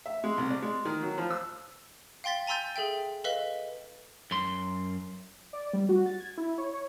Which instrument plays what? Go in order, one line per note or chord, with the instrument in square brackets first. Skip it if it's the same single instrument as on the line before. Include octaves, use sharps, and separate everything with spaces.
[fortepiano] E5
G#3
C2
D5
G#3
D#3
F#3
F3
E6
[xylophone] F5 G5 C6 A6 B6
G#5 A#5 C6 E6 G6 A6
G#4 A4 E5 G5
A4 B4 D#5 F5 B6 G7
[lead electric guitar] F#2 C6
[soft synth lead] D5
G3
F#4
A6
G#6
E4
C#5
C#5